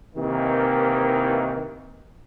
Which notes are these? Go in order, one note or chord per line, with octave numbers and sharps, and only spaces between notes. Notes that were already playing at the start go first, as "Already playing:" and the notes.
C3 D#3 E3 A#3